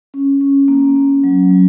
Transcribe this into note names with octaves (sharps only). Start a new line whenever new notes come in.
C#4
C#4
A#3
A#3
F#3
F#3